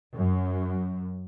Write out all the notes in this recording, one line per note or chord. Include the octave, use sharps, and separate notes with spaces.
F#2